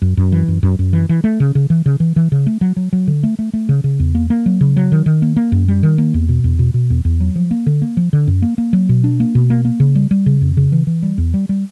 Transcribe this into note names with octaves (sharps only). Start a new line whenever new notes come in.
F#2
F#2
E3
F#2
F#2
F#2
E3
E3
A3
C#3
C#3
E3
C#3
E3
E3
C#3
A3
F#3
F#3
F#3
D3
A3
A3
A3
C#3
C#3
E2
A#3
A#3
F#3
C#3
F#3
D#3
D#3
A#3
A#3
F#2
G3
D#3
A#3
E2
B2
E2
B2
B2
E2
E2
F#3
F3
A#3
D3
A#3
F3
D3
F#2
A#3
A#3
F#3
B2
D4
A#3
B2
A#3
A#3
C#3
G3
G3
C#3
F2
C#3
E3
E3
G3
E2
G3
G3